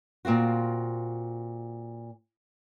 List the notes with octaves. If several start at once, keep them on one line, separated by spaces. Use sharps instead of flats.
A#2 C4 F4 F#4